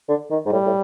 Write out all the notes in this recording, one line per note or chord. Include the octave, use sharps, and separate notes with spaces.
D3
D#3
G#2
A2 G3
A2